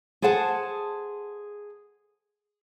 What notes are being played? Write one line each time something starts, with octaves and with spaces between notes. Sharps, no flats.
G#4 A4 C5 F#5 A5